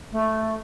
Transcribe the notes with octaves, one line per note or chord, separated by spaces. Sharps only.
A3